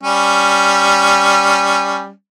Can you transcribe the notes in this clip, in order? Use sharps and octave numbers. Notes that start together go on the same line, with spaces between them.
G3 C#4